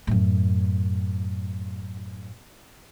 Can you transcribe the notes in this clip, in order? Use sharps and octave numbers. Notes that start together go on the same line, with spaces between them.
F#2 A2